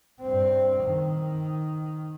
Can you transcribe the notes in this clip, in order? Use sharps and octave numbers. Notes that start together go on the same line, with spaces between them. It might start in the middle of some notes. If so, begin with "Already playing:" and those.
G2 C4
D#3